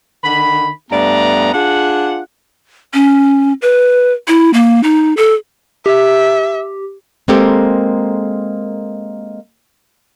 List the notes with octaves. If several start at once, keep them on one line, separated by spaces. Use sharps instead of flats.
D3 D#3 B5
G2 A3 B3 D5 A#5
D4 F4 G#4 F#5
C#4
B4
E4
A#3
D#4
A4
G4 E5
G#3 A#3 C4 G4 A4 A#4